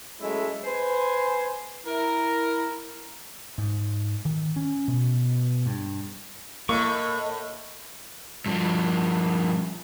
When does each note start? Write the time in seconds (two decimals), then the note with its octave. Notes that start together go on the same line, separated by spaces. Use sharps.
0.21 F#3 G#3 A3 C#4 E4 E5
0.64 B4 C5 G#5
1.86 E4 A#4
3.58 G#2
4.25 D#3
4.56 C#4
4.88 B2
5.66 G2
6.69 A2 A#3 D#5 C#6
8.46 G2 F3